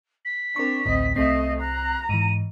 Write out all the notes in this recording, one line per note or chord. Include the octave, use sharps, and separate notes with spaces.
B6
C4 D4 A#4 C#6
A1 D2 A2 C4 D#5
C2 A3 C4 D#5 C7
A#5 F#6
G#2 E3 D#7